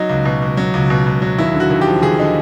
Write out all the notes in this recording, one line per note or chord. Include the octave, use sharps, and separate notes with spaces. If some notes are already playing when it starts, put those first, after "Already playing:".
Already playing: F#3 D#4
C#2
B2
C#2
F#3
C#2
B2
C#2
F#3
D#2 E4
D3
F#4
D#2
G4
F3
D#2 G#4
D3 D#4